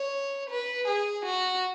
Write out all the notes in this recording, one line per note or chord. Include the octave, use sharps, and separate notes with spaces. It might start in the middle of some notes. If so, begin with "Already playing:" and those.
Already playing: C#5
B4
G#4
F#4